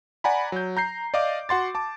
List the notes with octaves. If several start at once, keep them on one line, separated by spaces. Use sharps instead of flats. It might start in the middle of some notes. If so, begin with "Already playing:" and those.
D5 F#5 G#5 A#5 B5
F#3 G6
A#5 G6 C7
D5 D#5 F5 D6
F#4 F#5 C6 A6
A5 D6